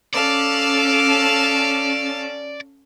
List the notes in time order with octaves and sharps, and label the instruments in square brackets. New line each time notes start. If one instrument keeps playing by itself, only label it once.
[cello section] C#4 [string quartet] A4 F5 A5 [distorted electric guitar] D5